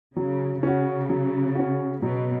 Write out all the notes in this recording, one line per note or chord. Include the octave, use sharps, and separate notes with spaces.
C#3 F#3
C#3 C#4 F#4
F#3
C#4 F#4
B2 F#3